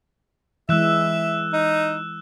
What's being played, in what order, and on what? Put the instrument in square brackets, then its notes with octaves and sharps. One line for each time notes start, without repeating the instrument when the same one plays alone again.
[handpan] E3 G#3 [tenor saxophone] E5 [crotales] E6 F#6 E7
[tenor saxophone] D#4